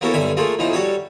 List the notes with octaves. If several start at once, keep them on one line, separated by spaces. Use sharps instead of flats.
A#3 B3 C#4 E4 F#4 A4
B1 G2 D3 E5 G#5
A3 A#3 F4 G#4 A4
B1 E3 F3 D#4 G#4
G3 F#4 A4 C#5